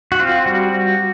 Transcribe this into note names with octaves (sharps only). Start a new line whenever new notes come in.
F#4
C4 F4
G3 F#4